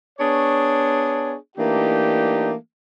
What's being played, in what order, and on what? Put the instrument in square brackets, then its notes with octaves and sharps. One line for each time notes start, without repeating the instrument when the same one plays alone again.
[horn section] B3 D4 G#4 C#5
E3 A3 A#3 D4 D#4 G4